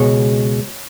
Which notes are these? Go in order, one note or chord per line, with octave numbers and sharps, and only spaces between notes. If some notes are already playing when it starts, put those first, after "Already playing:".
Already playing: C#2 B2 G#3 C#5